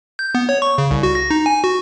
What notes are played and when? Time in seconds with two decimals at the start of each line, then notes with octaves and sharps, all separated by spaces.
0.19 G6
0.35 B3
0.49 C#5
0.62 C#6
0.78 C#3
0.91 C2
1.03 F#4
1.15 A#6
1.30 D#4
1.46 G#5
1.64 F#4